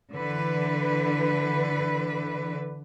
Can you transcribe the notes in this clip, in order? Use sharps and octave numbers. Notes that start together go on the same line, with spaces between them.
D3 E3 B4